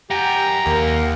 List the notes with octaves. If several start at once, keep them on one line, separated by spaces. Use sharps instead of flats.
G4 F#5 G#5 A#5
D#2 A#3
F5